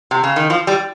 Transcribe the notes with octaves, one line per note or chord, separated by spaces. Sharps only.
C3
C#3
D#3
F3
G3